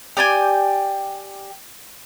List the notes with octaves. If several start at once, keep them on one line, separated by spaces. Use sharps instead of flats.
G4 D5 G5 G#5